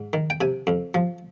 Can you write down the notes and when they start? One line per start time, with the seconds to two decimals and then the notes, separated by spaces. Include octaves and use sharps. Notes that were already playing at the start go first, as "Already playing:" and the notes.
Already playing: G#2
0.13 D#3
0.30 G5
0.41 C3 G#5
0.67 F2
0.94 F3